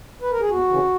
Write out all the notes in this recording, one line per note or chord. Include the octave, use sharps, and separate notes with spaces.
B4
A#4
G#4
E2 F#4
C#3 E3